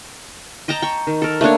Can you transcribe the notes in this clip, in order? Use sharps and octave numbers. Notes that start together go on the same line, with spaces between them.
D#5 G5 A5 A#5
G5 C#6
D#3
A4 A#4
A3 A#3 D4 C#5